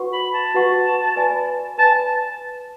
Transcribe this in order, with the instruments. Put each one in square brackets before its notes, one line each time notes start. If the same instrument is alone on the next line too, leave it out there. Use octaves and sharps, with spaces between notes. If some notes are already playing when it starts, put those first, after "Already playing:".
Already playing: [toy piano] F#4 B4 F#5 C#6
[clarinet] B5
A5
[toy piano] F#4 B4 F#5 C#6
B4 D5 G#5 B5
[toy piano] B4 D5 G#5 B5 [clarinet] A5